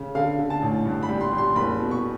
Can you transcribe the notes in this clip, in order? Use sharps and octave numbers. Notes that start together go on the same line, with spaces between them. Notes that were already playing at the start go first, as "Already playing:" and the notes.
Already playing: C#3
D3 F5
D3
A5
A1
G2
B5
G3
C6
G3
C6
F#1 B5
B2
C#6